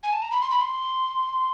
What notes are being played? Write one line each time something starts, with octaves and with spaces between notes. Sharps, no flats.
G#5
A5
A#5
B5
C6
B5
C6